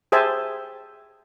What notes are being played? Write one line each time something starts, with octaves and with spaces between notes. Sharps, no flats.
G4 G#4 C5 E5 G#5 A5